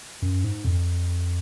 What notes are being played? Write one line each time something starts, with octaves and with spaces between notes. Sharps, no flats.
F#2
G#2
F2